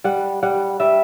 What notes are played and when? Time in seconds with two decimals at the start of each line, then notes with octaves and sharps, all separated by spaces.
0.04 G3 F#5
0.43 G3 F#5
0.80 G3 E5